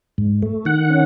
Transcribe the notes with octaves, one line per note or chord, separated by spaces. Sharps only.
G#2
A3
D#3 F#5
C#4